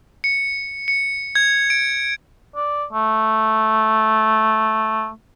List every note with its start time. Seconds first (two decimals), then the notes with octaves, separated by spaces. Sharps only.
0.24 C#7
0.88 C#7
1.35 G#6
1.70 D7
2.56 D5
2.93 A3